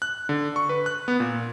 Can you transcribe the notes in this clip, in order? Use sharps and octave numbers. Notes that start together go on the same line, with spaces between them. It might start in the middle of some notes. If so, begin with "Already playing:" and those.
F#6
D3
C#6
B4
F#6
B3
A#2